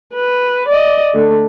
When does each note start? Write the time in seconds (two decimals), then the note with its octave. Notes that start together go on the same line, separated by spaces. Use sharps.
0.14 B4
0.69 D5 D#5
1.14 D3 A3